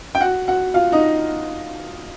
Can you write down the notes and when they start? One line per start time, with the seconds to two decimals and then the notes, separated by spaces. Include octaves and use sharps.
0.15 G5
0.21 F#4 F#5
0.48 F#4 F#5
0.74 F4 F5
0.92 D#4 D#5